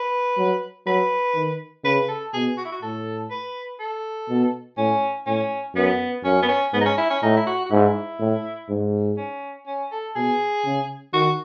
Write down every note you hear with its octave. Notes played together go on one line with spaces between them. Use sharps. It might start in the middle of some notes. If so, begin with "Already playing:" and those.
Already playing: B4
F#3
F#3 B4
D#3
C#3 B4
A4
B2 G#4
F#4
E4
F#4
A2 A4
B4
A4
B2
A2 C#4
A2 C#4
F#2 B3
F#2 C#4
B3
C#4
G#2 B3
D#4
C#4
E4
C#4
A2 D#4
E4
F#4
F#4
G#2 E4
A2
G#2
C#4
C#4
A4
B2 G#4
C#3
D#3 F#4